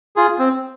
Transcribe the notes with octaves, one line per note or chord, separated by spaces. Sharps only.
F4 G#4
C4